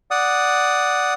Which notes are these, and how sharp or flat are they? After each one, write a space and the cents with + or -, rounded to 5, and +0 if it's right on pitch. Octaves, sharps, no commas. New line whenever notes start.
D5 +0 F#5 +0 D#6 +0